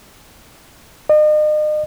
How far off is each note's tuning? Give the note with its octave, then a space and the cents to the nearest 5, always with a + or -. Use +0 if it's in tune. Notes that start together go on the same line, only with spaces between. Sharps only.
D#5 -40